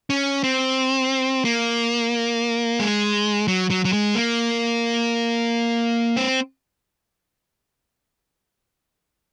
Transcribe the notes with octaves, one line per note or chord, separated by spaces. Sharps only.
C#4
C4
A#3
G#3
F#3
F#3
F#3
G#3
A#3
C4